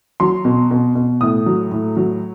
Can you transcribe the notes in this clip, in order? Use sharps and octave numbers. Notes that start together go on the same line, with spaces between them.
F#3 C6
B2
B2
B2
A2 D#6
F#3
A2
F#3